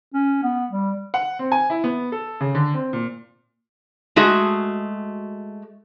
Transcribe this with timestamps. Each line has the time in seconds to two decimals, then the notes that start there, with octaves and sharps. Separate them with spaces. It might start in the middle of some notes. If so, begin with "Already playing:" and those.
0.14 C#4
0.43 B3
0.72 G3
1.14 F#5
1.39 C4
1.52 G#5
1.70 E4
1.84 B3
2.12 A4
2.40 C#3
2.55 D3
2.74 C4
2.93 A#2
4.16 G#3 A3 F#4 G#4